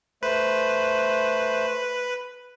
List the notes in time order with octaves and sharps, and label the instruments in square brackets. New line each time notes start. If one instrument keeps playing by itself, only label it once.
[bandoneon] A3 C5 [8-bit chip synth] B4